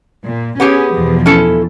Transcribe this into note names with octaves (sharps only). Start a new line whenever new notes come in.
A#2
B3 C#4 G4 G#4
E2 B2 F3
C#4 E4 A4